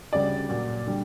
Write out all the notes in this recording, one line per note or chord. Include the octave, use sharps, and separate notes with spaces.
D2 C#3 G3 D5
A#2 F#3
D3 G3